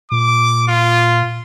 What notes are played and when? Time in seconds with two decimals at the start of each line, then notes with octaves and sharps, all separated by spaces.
0.11 A#2 D6
0.68 F4